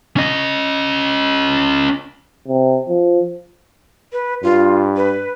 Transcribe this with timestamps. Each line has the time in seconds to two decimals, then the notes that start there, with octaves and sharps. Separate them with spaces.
0.16 C#4 D#5
2.48 C3
2.89 F3
4.12 B4
4.43 G2 F4
4.96 B4